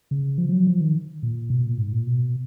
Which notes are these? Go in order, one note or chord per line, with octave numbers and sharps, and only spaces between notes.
C#3
F3
F3
F#3
F3
D#3
A#2
B2
A#2
G#2
A#2
B2